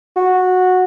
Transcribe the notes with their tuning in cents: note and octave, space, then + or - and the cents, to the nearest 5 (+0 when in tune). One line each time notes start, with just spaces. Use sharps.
F#4 -10